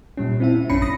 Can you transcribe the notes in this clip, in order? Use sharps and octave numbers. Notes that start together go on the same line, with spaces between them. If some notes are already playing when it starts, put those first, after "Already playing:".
A#2 G3 C#4
C4 E4 E5
A1 F#2 C#4 D4 B5 C#7
B5 D#6 A#6